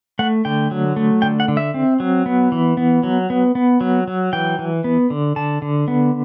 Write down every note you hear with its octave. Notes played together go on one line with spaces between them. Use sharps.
A3 F#5
D3 G5
F#3
A3
D3 G5
F#5
D3
E5
C4
F#3
B3
E3
B3
F#3
B3
B3
F#3
F#3
E3 G5
E3
B3
D3
D3 A5
D3
B3